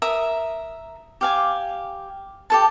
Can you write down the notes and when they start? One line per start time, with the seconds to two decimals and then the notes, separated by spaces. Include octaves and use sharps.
0.02 A#4 E5 D#6
1.21 G4 F5 G#5
2.50 G4 A4 A5